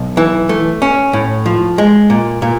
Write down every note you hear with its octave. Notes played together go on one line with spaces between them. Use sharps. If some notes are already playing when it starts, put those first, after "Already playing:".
Already playing: B1
E3
A3
C#4
A2
F3
G#3
A#2
A#2